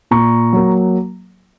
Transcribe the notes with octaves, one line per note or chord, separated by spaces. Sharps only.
A#2 A#5 C#6
F#3 A#3